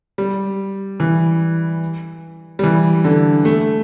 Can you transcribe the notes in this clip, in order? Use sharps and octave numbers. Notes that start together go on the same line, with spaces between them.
G3
E3
G3
E3
D3
A3